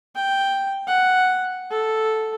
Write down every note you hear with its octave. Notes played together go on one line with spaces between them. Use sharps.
G5
F#5
A4